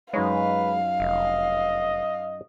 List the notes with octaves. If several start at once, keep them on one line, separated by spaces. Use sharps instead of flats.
F#2 G#3 D#4 B4 C#5 F5
F1 D#5